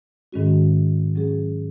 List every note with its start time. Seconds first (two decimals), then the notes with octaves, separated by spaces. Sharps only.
0.33 G#2 D#3 G#3 C#4 F#4
1.15 F#3 C#4 G#4